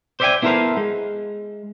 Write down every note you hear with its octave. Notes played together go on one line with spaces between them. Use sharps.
C5 D5 E5 F5 G5 G#5
B3 E4 A4 A#4 C5 F5
G#3